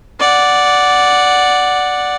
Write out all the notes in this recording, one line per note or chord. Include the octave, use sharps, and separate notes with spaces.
D5 F#5